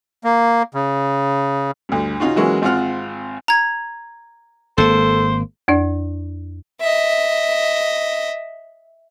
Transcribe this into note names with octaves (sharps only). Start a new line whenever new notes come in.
A#3
C#3
D2 G2
C#3 C#4 D#4 F4 F#4
E3 F#3 G#3 A#3 C#4 F#4
G#1 C4 F4 F#5 F6
A#5 G#6
G#1 A#3 A4 C5
F2 D4 D5
D#5 E5